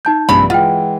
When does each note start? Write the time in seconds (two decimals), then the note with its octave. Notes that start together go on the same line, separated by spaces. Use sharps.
0.05 D#4 A5 G6
0.29 A#1 G2 C3 G#3 B5
0.50 E3 G#3 F4 F#5 G5